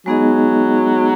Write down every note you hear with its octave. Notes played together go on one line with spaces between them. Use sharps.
F#3 G#3 B3 D#4 G#4 D#5